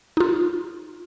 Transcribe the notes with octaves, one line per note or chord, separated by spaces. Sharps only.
D#4 F4